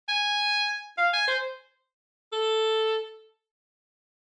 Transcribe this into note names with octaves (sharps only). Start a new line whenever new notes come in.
G#5
F5
G#5
C5
A4